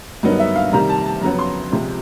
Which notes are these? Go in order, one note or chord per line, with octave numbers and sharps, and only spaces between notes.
G2 D3 F#3 B3 D#4 A#4
E5
F5
C3 D#3 G3 A#5
A5
A5
F2 C#3 F#3 B3 A#5
C6
C#2 C3 F3 G#3